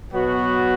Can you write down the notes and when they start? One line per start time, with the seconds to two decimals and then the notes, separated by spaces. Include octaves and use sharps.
0.12 B2 F#3 B3 F#4